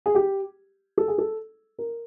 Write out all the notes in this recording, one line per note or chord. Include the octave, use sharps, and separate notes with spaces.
G#4
G4
A4
G#4
A4
A#4